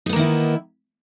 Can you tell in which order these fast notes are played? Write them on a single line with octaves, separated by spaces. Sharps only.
D#4 B3 A#3 D#3 E4